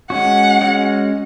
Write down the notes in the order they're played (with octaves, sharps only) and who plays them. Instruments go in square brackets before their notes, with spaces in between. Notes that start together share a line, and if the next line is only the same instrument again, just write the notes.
[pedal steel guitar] G#3 C#4 F#4 [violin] F#5
[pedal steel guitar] G#3 C#4 F#4